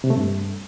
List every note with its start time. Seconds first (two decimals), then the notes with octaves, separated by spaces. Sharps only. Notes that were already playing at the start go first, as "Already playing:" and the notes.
0.04 C3
0.10 A3
0.17 G2